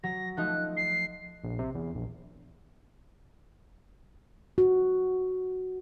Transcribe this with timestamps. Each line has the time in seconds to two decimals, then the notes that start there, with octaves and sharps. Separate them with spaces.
0.04 F#3 A#6
0.37 F3 A3 D#4 F#6
0.77 C7
1.44 A#1
1.59 C3
1.75 E2
1.95 A#1
4.58 F#4